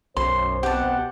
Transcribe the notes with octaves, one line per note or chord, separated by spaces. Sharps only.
B1 F#2 C5 C6
B2 C4 G4 F#5 A5